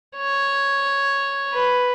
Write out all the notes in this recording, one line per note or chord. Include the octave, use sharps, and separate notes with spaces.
C#5
B4